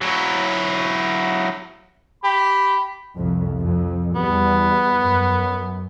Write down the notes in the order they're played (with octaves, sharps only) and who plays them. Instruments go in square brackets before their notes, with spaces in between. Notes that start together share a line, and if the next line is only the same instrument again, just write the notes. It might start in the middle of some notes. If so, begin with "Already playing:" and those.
[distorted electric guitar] F#3 E4
[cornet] G4 [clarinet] B5
[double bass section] C2 F2
F2
[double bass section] E2 G3 [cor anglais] B3
[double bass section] F#2